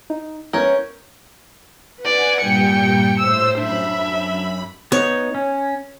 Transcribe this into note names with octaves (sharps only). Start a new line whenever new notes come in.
D#4
B3 C#4 E4 A#4 C#5 G6
B4 D5 F#5 G#5
G2 A#2 G3 G5 C#7
A2 C5 E6
F#2 D4 E5 B5
B3 D#4 C#5
C#4